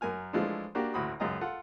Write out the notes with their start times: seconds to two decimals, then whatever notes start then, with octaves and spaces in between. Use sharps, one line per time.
0.01 F#2 A#4 G#5 F6
0.33 E3 F3 G#3 A3 D4
0.75 A#3 D4 F#4 G4
0.94 A1 D2 F#4 B5 D#6
1.20 C#2 F#2 F4 G#4 D#5 A#5
1.41 F4 A4 F#5